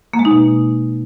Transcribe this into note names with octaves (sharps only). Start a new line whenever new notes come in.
A#3
G#3
D#4
B2